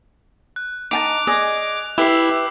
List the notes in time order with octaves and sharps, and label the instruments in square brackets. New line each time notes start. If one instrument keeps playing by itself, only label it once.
[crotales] F#6
[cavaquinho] D#4 G5 A5 [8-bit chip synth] D6 [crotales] F7
[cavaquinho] G#4 D5 D#5
[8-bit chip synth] E4 [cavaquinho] G4 B4 E5 [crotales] D6 E6 C7